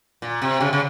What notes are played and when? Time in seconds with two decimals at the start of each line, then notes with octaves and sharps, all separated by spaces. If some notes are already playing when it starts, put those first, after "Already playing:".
0.22 A#2
0.42 C3
0.61 C#3
0.73 C#3